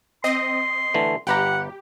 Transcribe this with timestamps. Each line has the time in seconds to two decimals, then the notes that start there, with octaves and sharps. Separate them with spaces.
0.24 C4 D#5 C6
0.94 D3 E3 A3
1.27 G1 G4 B4 F#5 A#5